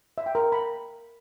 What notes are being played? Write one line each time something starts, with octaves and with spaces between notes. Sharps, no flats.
E5
G5
A#4
G5
B5